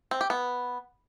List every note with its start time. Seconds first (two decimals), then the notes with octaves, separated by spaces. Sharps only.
0.11 C4
0.21 G4
0.30 B3